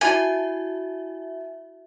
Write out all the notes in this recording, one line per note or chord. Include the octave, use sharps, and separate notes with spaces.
E4 F#4 E5 G#5